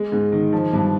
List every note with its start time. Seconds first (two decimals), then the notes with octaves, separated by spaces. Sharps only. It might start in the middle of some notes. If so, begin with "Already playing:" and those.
Already playing: G#3
0.12 G#2
0.32 D#3
0.52 F3
0.73 G2